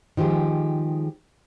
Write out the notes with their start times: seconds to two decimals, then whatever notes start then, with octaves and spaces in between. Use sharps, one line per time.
0.17 D#3 F3 G#3 G4 G#4